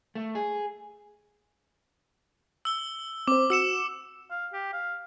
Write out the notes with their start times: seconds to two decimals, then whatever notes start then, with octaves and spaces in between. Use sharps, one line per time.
0.15 A3
0.35 G#4
2.65 E6 G7
3.28 C4 C5 D6
3.50 F#4 E6 C#7 E7
4.31 F5
4.53 G4
4.73 F5